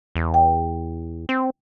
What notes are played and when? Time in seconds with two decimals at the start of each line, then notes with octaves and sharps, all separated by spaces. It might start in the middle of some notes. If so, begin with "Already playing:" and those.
0.16 E2
0.34 G5
1.29 C4